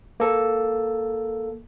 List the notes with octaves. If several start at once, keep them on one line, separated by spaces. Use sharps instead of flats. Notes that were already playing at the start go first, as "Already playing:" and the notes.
A#3 A4